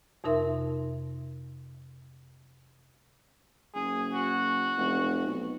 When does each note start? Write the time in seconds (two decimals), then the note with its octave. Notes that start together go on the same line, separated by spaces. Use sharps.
0.24 F2 C3 D#4 A#4 E5 C6
3.75 F#1 G#4
4.14 F#4
4.77 F1
5.27 B1